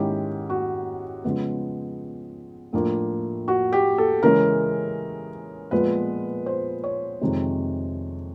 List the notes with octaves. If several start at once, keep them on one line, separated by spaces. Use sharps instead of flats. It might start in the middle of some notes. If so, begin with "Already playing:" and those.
Already playing: G#2 D#3 G#3 C#4 E4 G4
F#4
C#3 F3 G#3 B3
A2 F3 A#3 D4
F#4
G4
A4
C#3 E3 G#3 C#4 A#4
A#2 F3 G#3 B3 B4
C5
C#5
F2 C3 D#3 G#3